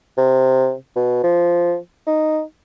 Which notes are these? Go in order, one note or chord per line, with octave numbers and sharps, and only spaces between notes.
C3
B2
F3
D#4